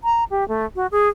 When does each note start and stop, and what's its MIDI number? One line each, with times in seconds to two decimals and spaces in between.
0.04 0.24 82
0.30 0.47 67
0.48 0.65 57
0.76 0.87 66
0.92 1.09 68